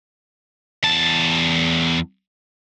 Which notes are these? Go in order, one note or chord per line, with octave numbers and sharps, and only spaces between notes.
E2 A5